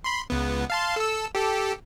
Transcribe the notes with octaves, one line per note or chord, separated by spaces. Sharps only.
B5 C6
C#2 B3
F5 A5 C6
A4 E6
G4 A4